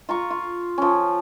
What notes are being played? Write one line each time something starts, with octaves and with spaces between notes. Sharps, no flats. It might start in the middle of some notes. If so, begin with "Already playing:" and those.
F4 A#5 C#6
F4
F3 C#4